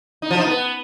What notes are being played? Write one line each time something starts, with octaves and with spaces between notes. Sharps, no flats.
D#4
F3
D#4
B3